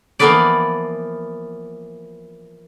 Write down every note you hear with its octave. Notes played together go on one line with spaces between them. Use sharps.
E3 F3 A#3 B3 B4 D5